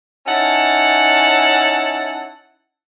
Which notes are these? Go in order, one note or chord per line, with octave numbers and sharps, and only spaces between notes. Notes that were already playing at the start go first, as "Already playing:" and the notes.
C#4 D#4 E4 F#5 A5